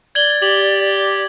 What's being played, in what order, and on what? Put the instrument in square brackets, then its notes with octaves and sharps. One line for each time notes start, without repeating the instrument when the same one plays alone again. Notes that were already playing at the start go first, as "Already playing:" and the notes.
[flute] D5 [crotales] G#6 F#7 G7
[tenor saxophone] G4 [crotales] F#7